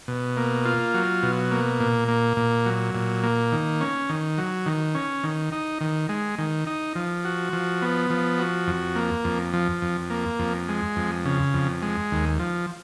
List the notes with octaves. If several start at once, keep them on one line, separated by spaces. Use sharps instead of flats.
B2
A#3
F4
F#3
B2
A#3
A#2
A#3
A#2
F#3
A#2
A#3
D#3
C#4
D#3
F#3
D#3
C#4
D#3
D#4
D#3
G#3
D#3
D#4
F3
F#4
F3
B3
F3
F#4
F2
A#3
F2
F3
F2
A#3
F2
G#3
F2
C#3
F2
G#3
D#2
F3